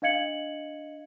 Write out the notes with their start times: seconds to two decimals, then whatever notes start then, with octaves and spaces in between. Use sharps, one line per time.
0.02 D4 D#5 F5 G#6 C#7 F#7